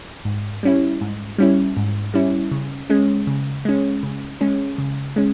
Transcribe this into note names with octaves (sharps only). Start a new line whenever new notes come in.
G#2
G3 C#4 E4
G#2
G3 C#4 E4
G#2
G3 C#4 E4
C#3
G#3 C#4
C#3
G#3 C#4
C#3
G#3 C#4
C#3
G#3 C#4